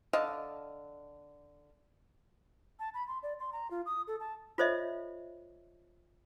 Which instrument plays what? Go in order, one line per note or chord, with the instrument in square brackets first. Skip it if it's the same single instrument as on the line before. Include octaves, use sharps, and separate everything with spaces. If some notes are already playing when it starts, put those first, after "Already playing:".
[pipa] D3 D#5 F5 A5
[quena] A5
B5
C6
D5
C6
A#5
F4
D#6
A4
A5
[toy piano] F4 A4 C5 C#5 D#5 E5